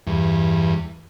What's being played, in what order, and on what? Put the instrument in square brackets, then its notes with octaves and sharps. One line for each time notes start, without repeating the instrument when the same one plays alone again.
[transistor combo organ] E2 G2